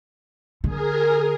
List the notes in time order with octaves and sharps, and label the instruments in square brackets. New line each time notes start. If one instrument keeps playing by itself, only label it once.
[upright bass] D3 [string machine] G#4 A#4